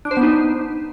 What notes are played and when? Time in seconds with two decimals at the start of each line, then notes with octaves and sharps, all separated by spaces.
0.05 D4
0.11 C5
0.17 B3
0.23 D#4